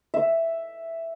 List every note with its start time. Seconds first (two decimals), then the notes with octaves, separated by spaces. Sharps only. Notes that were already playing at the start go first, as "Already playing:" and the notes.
0.14 E5